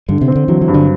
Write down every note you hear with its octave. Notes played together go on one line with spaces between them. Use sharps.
G2 D3
C3
C4
D3
E3 F#3
E3
G2
D3